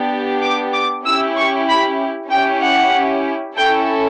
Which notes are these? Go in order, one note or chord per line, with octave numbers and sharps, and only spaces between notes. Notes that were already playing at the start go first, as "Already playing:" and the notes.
Already playing: B3 D4 G4
D6
D6
C#4 E4 G4 E6
C#6
B5
C#4 E4 G4 G5
F#5
C#4 E4 A4 G5